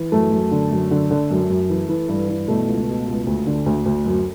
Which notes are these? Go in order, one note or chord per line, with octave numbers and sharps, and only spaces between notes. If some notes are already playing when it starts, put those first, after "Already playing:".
Already playing: E3
F#2 A3
F#2
D3
F#2
D3
D3
F#2
F#2
E3
E3
G2
E3
B2 A3
C#2
B2
C#2
D2
D3
D2
D2
F#2